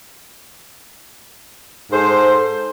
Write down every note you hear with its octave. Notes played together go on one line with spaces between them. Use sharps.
G#2 A4 C5